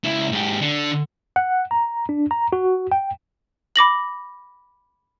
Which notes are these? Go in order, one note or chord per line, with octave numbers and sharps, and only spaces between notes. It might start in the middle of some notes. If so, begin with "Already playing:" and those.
C#2 E4
G#2 G4
D3
F#5
A#5
D4
A#5
F#4
G5
B5 D6 A#6 F#7